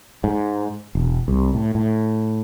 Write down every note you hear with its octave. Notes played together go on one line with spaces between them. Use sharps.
G#2
E1
C2
A2
A2